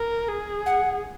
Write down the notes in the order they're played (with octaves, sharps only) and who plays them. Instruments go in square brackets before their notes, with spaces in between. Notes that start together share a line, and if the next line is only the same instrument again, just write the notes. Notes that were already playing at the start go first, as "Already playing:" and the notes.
Already playing: [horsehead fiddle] A#4
G#4
[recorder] F#5